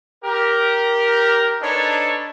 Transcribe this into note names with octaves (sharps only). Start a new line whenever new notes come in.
G4 A#4
D4 D#4 A4 B4 C#5